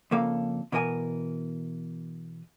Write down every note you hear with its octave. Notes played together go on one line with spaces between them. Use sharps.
F2 C#3 A#3 A4 F5
B2 E3 A#4 D5 G#5